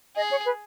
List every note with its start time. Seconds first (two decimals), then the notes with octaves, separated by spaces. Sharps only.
0.16 G#4 D#5
0.31 C#5
0.46 B4